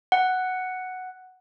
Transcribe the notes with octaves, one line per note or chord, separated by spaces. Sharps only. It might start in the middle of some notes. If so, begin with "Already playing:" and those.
F#5